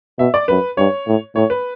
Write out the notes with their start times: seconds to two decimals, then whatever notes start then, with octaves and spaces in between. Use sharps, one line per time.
0.19 B2 E5
0.34 D5
0.48 F#2 B4
0.77 G2 C#5
1.07 A2
1.35 A2 C#5
1.50 B4